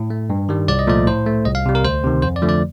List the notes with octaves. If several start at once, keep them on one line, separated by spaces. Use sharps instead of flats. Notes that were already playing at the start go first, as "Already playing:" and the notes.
Already playing: A2
A3
G2
D#3 G3
C2 D5
D#5
A#2 F3 A3 D5
A2 C5
A3
C2 D#5
F5
C3 G3
A#4
D2 C5
C3 D#3
F2 C5
D5
D3 F3 A3
D5